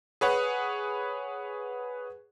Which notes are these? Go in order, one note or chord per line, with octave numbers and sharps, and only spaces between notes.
G#4 B4 C#5 F#5